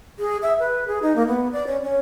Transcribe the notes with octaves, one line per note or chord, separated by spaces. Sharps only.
G#4
E5
B4
G#4
D#4
A#3
B3
D5
C#4
C#4